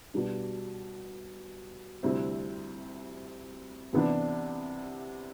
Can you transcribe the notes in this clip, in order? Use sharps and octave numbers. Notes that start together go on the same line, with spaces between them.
B2 G3 D4
D2 C3 G3 C4 E4
C2 C3 E3 B3 D4